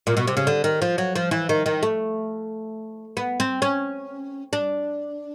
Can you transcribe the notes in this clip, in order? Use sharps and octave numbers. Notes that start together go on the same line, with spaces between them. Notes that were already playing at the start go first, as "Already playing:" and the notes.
A#2
B2
C3
C#3
D3
D#3
F3
F#3
F3
E3
D#3
D#3
A3
B3
C4
C#4
D4